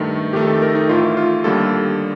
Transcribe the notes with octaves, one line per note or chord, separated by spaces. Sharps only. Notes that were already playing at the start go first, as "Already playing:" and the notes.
Already playing: G2 D#3 A3
F2 D#3 A3 G4
A4
A#4
D#4
A1 A2 A3 F4
F4
D#2 D3 G3 A#3 A4